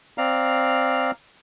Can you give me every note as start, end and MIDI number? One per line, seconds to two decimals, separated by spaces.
0.18 1.11 60
0.18 1.11 74
0.18 1.11 77
0.18 1.11 82